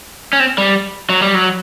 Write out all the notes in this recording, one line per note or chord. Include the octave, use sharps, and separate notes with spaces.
C#4
C4
G3
F#3
G3
F#3